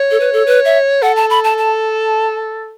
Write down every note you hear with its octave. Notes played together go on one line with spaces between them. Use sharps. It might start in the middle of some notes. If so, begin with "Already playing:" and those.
Already playing: C#5
A4
B4
A4
B4
E5
A4 F#5
A5
B5
A5
A5